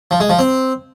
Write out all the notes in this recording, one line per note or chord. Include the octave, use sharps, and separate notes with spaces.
F3
G#3
F3
C4